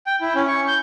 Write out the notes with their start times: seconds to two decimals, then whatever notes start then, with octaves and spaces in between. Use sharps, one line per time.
0.06 G5
0.21 E4
0.35 C#4
0.48 C#6
0.68 G6